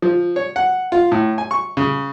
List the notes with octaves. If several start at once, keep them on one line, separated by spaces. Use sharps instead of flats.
F3
C#5
F#5
F4
A2
G#5
C#6
C#3